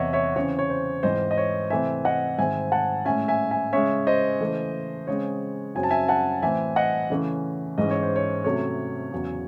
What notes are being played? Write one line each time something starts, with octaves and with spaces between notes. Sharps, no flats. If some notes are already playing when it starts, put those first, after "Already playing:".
Already playing: E2 C3 E3 C#5 D#5 E5 F#5
C#5 E5
C#3 E3 C4 C#5
C#5
C5
G#2 E3 C4 C5 D#5
D#5
C#5
C3 E3 A3 C4 E5 G#5
D#5 F#5
G#2 D#3 G#3 C4 E5 G#5
F#5 A5
A2 G#3 C#4 E5 G#5
E5 G#5
E5 G#5
C#3 G#3 C#4 C#5 E5
C5 D#5
C#3 E3 A3
C#3 G#3 C4 C#5
F#2 C#3 F#3 C4 G#5
A5
E5 G#5
F#5 A5
A2 E3 C4 E5 G#5
D#5 F#5
C#3 E3 A3 C#4
G#2 E3 G#3 C#4 D#5
C#5
C5
C#5
C3 F#3 A3 C#4 C#5
E2 C#3 F#3